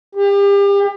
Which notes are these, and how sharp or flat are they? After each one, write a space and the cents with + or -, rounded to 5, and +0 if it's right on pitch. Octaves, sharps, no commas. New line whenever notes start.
G4 +35